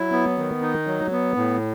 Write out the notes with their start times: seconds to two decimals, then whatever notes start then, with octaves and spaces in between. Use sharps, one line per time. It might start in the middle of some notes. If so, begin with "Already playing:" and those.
Already playing: F#3 E4
0.12 B3
0.38 D#3
0.62 D#4
0.87 F#3
1.12 B3
1.37 A2